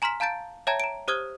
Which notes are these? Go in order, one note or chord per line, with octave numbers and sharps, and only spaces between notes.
G#5 A#5 C6 F6 B6 E7
F5 A5 A#5 G6 A6 D7
C#5 E5 G5 A5 A#5 G#6
A#5 D7
G4 C5 D#6 F6 G#6 G7